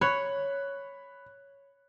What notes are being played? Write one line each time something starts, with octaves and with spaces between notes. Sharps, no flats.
C#5 B5 F#6